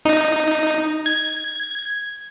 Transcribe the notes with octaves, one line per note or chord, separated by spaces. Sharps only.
D#4
G#6